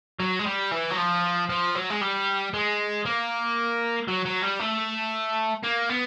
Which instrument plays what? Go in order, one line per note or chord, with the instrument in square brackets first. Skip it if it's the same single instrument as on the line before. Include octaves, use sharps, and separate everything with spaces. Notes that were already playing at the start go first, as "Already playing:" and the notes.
[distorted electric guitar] F#3
G#3
G3
E3
F#3
F3
F3
F#3
G#3
G3
G#3
A#3
F#3
F#3
G3
A3
A#3
B3